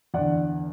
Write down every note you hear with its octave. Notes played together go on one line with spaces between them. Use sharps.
E2 D3 D5 F#5